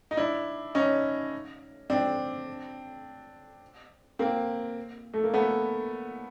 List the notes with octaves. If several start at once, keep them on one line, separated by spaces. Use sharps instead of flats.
D#4
D4 E4
C#4 D#4
C4 D4
A#3 C4
A3
A#3
A3 B3